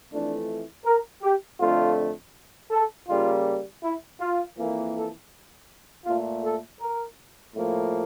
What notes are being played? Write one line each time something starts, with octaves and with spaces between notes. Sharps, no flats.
F2 E3 A3 D4
A#4
G4
F2 D3 A3 F4
A4
C#3 G3 A#3 F4
E4
F4
F2 E3 A#3
A4
A#2 A3 F4
A4
A#4
A2 F3 A#3